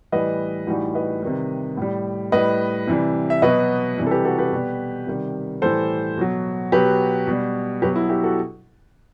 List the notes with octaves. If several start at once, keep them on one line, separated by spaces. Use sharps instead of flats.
A2 E3 G3 B4 D#5
A2 E3 G3 D#4 F#4
B4 D#5
C3 D#3 G3
A2 G3
A2 G3 B4 D#5
C3 E3 G3
E5
B2 F#3 B4 D#5
C3 E3 G3
A4
G4 B4
F#4 A4
G4 B4
B2 G3
C3 D#3 G3
A2 E3 G3 A4 C5
B2 F#3
B2 F#3 G4 B4
B2 G3
B2 F#3 G4 B4
E4
E4 G4
F#4 A4